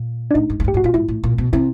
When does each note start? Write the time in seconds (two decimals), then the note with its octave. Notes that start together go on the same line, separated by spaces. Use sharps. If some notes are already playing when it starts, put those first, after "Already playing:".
Already playing: A#2
0.31 D4
0.34 A2 D#4
0.50 G#2
0.60 G2
0.64 G#2 G4
0.74 A2 F#4
0.84 A#2 F4
0.94 G#2 E4
1.08 A2
1.24 A#2
1.38 B2
1.53 C3 E4